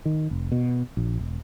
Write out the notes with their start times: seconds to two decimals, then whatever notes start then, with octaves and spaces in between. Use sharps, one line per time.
0.05 D#3
0.31 F1
0.52 B2
0.97 A#1
1.19 E1